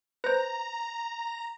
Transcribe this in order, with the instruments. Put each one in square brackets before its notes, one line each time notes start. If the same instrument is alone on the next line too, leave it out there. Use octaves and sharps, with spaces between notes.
[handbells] B4 C5 [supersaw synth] A#5